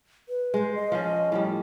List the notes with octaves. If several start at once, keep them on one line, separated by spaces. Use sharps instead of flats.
B4
G#3 C5
D#5
F3 C#4
A2 F3 G3